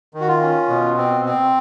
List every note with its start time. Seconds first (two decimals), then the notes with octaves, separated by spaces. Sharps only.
0.14 D#3
0.21 F#4
0.28 F4
0.42 C#4
0.69 B2
0.97 C4
1.25 C4